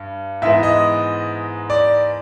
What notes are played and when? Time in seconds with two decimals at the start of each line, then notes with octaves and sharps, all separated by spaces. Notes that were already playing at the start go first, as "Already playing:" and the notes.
Already playing: G2
0.42 G#2 E3 G#3 B3 E5
0.63 D#5
1.70 D5